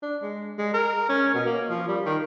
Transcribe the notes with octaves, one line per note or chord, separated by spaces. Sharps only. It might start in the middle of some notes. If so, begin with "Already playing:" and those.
D4
G#3
G#3
A#4
C#4
B2
A#3
F3
G3
D#3